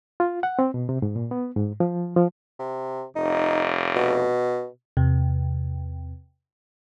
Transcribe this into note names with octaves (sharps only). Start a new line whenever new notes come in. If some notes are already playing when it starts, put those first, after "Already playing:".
F4
F#5
C4
B2
C3
G#2
A#2
B3
G#2
F3
F3
C3
F1 D#4
B2
E2 C3